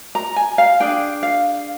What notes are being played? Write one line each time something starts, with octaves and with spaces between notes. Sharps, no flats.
A#5
G#5
F5
D4 G#4 G5
F5